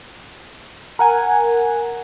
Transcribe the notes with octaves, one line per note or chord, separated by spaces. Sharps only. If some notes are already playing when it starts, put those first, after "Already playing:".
A#4 F#5 G#5